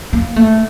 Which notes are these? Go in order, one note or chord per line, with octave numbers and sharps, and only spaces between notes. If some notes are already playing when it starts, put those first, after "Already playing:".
A#3
A3